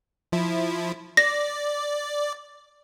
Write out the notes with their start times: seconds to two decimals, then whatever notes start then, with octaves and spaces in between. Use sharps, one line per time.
0.32 F3 E4
1.17 D5 A#6